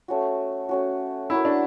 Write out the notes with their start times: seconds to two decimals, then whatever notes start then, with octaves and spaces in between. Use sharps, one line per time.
0.08 A3 C#4 F#4
0.69 A3 C#4 F#4
1.30 C#4 E4 F#4 A#4
1.45 D4